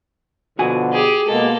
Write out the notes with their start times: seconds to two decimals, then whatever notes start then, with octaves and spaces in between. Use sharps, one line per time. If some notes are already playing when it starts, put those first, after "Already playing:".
0.59 B2 D3 F3 F#4 G#5
0.93 G4 G#4
1.27 B2 G#3 A#3 A4